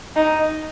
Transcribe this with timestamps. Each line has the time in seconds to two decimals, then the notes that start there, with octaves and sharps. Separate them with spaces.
0.16 D#4